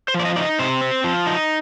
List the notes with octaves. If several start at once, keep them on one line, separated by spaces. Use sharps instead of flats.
C5
F3
D5
D#5
D#4 D5
D#5
C3 C5
C4
F3
D#4